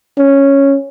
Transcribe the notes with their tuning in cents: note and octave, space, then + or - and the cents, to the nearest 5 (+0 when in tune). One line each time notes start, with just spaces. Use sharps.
C#4 -5